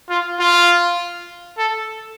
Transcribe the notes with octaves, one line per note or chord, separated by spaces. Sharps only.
F4
F4
A4